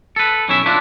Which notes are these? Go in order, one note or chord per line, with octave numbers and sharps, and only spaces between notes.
A4 B4
B1 C#4 E4 E5
D4 E4 F4 B4